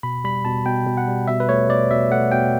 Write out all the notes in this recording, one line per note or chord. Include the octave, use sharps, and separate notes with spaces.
B2 B5
G3 B5
B2 A5
B2 G5
B2
F#5
G3
B2 E5
B4
A3 C#5
B2 D5
B2 E5
A3 F#5
B2 G5